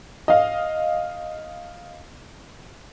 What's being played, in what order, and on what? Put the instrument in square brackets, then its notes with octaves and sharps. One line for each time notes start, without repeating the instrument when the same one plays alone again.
[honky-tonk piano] D#5 F5